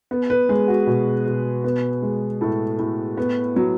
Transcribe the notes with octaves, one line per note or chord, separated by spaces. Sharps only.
B3
B4
G#3 G#4
F#4
B2 G#4
B2
B3
G#3
A2 A4
A2
B3
F#3